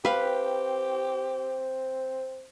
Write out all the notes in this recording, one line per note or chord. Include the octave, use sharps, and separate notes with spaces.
C4 G4 B4 F5